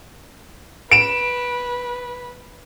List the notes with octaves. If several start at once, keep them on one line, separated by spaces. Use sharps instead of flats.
B4 D7 E7